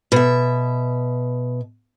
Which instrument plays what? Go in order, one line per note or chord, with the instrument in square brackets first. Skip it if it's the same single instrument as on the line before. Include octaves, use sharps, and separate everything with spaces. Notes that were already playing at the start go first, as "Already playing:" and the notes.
[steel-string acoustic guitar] B2 E5